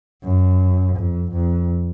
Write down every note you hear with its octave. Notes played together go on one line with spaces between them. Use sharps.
F#2
F2
F2